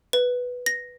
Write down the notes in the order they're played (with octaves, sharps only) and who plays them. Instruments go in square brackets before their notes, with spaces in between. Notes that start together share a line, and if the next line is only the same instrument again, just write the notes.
[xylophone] B4
A#6